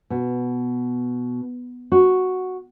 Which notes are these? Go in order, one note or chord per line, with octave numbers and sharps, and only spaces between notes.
B2
F#4